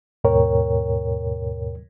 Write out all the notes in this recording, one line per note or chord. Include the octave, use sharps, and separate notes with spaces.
D#2 G#2 B2 A#4 C#5 G5